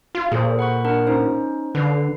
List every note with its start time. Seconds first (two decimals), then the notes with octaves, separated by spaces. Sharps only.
0.15 F4
0.32 A#2 G#4 A4 C5
0.59 F#5 B5 C#6
0.85 D4 A#4 F#5
1.07 C#4 D#4 C5
1.75 D3 B4 C7